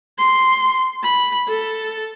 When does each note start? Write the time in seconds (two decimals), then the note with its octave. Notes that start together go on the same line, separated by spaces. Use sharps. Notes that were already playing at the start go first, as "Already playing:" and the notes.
0.18 C6
1.03 B5
1.48 A4